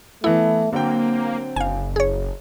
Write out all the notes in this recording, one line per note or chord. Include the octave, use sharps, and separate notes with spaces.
E3 A3 B3 E4
D3 F#3 A#3 C4 G5
F#1 F5 G#5
G#4 C#5